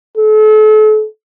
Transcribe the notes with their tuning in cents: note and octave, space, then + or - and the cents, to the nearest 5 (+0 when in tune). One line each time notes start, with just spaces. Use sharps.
A4 -40